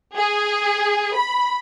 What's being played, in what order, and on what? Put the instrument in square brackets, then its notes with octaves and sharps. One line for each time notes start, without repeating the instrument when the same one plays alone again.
[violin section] G#4
B5